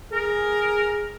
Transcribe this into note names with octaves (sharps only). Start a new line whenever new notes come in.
G#4 A#4